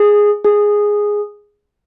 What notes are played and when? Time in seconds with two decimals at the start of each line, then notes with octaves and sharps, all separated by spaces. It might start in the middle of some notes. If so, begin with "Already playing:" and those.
Already playing: G#4
0.44 G#4